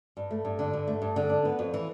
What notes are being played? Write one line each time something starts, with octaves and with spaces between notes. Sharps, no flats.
G2
A3
G2
D3
G2
A3
G2
D3
D4
B3
F2
E3